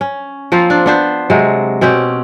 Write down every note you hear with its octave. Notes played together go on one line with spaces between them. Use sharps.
C#4
F3 A#3 C4 F4
D4
B3 D4 C5
C3 F#3 G#3
B2 C4 C#4 G4